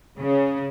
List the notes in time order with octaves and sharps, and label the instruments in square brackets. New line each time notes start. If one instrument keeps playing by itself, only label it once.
[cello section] C#3